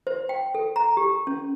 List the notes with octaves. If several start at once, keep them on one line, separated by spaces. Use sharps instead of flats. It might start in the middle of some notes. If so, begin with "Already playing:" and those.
C5
G5
A4
A#5
G4
C#4